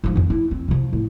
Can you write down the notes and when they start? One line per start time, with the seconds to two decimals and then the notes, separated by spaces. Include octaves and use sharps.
0.04 G#2 F3
0.15 F2 D#3
0.30 E4
0.51 C4
0.68 C3 F3
0.93 A2